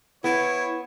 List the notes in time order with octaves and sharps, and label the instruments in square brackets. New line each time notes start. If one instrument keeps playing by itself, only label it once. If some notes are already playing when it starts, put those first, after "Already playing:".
[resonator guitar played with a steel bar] B3 [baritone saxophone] E4 [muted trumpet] C#5